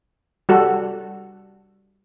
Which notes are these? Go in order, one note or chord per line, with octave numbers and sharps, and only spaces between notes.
G3 F#4 A4